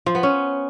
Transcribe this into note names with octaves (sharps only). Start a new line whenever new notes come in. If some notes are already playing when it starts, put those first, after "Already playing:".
F3
B3
C#4